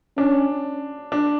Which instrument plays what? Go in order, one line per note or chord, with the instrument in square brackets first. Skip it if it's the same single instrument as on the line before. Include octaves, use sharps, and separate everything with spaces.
[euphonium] C#4 [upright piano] D4
[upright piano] D4